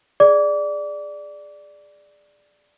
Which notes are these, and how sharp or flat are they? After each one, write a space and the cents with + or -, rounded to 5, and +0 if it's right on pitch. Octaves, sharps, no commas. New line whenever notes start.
G#4 +0 D5 +5 D6 -30